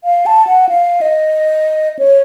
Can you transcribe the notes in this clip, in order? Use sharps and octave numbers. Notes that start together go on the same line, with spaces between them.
F5
A5
F#5
F5
D#5
C#5